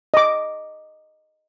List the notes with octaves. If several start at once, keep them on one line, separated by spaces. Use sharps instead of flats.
D#5 D6